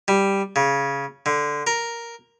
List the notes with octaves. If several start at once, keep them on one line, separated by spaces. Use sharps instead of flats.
G3
C#3
D3
A#4